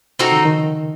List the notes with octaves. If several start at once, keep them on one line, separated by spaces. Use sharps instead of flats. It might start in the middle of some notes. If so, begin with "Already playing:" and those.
C3 C4 D#4 F#4 A4
D#3
C#3
D#3
F3